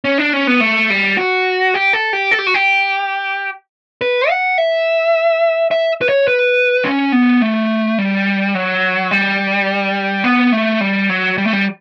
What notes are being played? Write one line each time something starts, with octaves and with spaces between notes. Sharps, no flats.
C#4
D4
C#4
B3
A3
G3
F#4
G4
A4
G4
A4
G4
F#4
G4
B4
F#5
E5
E5
B4
C#5
B4
C#4
B3
A3
G3
F#3
G3
B3
A3
G3
F#3
G3
A3
G3